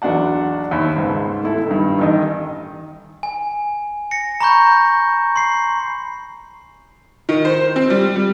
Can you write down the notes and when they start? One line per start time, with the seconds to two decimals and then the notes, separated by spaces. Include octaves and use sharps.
0.02 B1 E2 D4 F#4 F#5 A5
0.71 D#2 E5 B5
0.96 C#2 G#2
1.43 A3 E4 A4
1.67 G2 D#3
1.99 A1 D#3 D#5
3.23 G#5
4.11 A#6 C#7
4.40 A#5 B5 C#6 G6
5.36 C6 C7
7.29 D#3
7.45 C5
7.76 C4
7.90 G3
8.16 G3